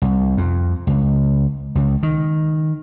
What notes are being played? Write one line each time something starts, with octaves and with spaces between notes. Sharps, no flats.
C2
F2
C#2
C#2
D#3